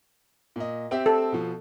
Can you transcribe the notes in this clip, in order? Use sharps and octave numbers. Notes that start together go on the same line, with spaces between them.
A#2 D#5
C4 G4 E5
A4
B2 F3